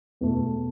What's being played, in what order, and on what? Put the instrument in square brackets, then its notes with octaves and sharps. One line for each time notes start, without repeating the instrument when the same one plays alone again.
[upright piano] E2 B2 A3